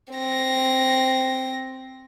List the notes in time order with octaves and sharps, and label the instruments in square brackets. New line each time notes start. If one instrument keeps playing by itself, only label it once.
[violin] C4 A#6